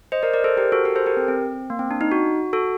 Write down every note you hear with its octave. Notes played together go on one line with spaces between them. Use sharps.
C5 D#5
A#4 D5
A#4 D5
A4 C5
G4 A#4
F#4 A4
G4 A#4
A4 C5
G4 A#4
C4
C4
A#3
C4
D4
D#4
F#4
F#4 A4